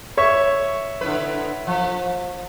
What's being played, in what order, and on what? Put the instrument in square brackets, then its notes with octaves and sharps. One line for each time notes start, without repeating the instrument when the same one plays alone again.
[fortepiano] C#5 E5 C#6
[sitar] D3 E4 B4
F3